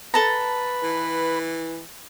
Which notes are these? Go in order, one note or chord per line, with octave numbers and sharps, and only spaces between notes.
A4 B4 A5 A#5
E3